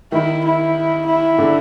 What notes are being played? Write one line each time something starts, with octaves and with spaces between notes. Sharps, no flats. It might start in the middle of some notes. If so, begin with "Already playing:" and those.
D#3 E4
E4
E4
D3